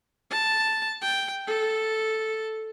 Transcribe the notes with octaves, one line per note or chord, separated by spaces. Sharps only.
A5
G5
A4